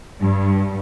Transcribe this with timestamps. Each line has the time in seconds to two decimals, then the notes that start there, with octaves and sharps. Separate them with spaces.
0.20 G2